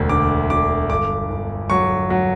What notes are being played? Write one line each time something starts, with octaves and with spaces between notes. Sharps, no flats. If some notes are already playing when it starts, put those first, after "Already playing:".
Already playing: E1 D2
D3 D6
E1 D6
G1 D6
G1
F#3 C#6
F#3